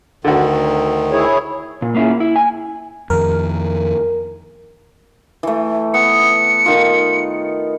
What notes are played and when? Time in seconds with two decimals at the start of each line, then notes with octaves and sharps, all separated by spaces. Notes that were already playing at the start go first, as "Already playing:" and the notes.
0.24 D2 D3 D#3 F#4
1.12 E4 G#4 C#5
1.82 A#2
1.95 A#3 C#4 E4 F4 G#4
2.20 E4
2.36 G#5
3.10 F2 D#3 A#4
5.43 E3 A3
5.94 B3 C#7
6.66 D#3 F4